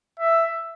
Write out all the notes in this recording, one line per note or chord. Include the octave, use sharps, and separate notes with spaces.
E5